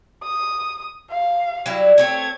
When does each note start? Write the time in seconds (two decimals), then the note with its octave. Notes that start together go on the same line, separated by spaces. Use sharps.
0.23 D#6
1.10 F5
1.66 F#3 G3 E4
1.98 A3 C4 C#5 G#6